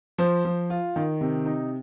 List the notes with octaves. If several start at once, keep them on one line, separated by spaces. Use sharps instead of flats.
F3 C5
F3
F4
D#3
C3
D#4